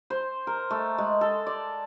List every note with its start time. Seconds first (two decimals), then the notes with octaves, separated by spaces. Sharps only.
0.10 C5
0.47 A#4
0.70 A3
0.98 G#3
1.21 A4
1.47 D5